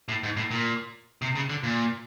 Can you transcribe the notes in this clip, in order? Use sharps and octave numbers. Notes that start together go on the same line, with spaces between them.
A2
G#2
A2
A#2
C3
C#3
D3
A#2